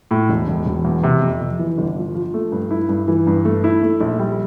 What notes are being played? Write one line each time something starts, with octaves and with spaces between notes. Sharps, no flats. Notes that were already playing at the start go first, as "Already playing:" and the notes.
A2
E1
E1
E1
E2
C3
F2
C3
E3
G1
F3
F3
A3
G2
E4
G2
E3
G2
A3
E4
A3
A#1
G3